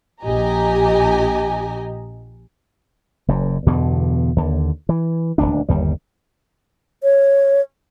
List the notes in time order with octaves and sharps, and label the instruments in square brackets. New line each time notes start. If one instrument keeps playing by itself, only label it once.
[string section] A#1 G4 D#5 G#5 A#5
[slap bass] F#1 F#2
E2 G2 B2 D3
D#2 D3
E3
D#1 G#1 D2 D4
G1 D#2 G3
[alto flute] C#5